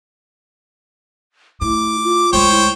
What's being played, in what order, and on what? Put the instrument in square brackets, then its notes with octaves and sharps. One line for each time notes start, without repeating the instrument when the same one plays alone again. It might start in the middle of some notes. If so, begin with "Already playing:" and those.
[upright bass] A3 [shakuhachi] E4 [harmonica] D6
[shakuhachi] F4
[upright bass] D2 G#3 [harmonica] C5 C#5 G5
[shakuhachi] E4